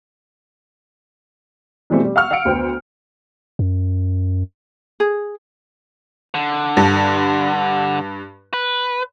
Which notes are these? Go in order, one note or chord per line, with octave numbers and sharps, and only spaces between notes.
B2 E3 G3 A3 C4
G3
F5 F#5 C#6 E6 F6
F5 F#5 E6 C#7 D7
D2 B3 C5 G5
F#2
G#4
D3
G2
B4